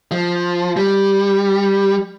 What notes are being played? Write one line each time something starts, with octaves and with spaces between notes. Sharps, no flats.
F3
G3